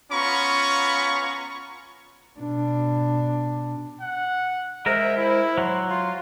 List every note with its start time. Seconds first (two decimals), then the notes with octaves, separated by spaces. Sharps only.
0.12 B3 C#4 F4 A#5 B5 C#6
2.39 B2 D4
4.01 F#5
4.86 G#3 A#4 C5 E5
5.17 E4
5.58 F#3 C6
5.88 F4 C6